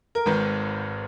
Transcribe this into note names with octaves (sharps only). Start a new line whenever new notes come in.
A#4
G#1 G#2 D#3 B4